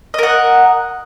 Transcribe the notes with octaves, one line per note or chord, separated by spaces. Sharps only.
A#4 D#5 F#5